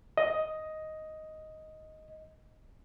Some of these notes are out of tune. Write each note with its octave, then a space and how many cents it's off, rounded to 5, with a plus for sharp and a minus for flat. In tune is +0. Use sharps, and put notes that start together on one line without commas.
D#5 +5